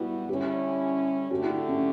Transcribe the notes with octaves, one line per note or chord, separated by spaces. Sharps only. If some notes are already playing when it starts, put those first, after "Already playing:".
Already playing: G3 B3 E4 F#4
D3 G3 C#4 E4 G4
D3 A3 D4 F#4 G4
E4
C#4